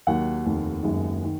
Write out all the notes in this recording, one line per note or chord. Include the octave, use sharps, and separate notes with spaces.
D#2 D#3 F#3 A#3 F#5
F1 D#2 D#3
F#1 F#2 D#3 G#3
D#3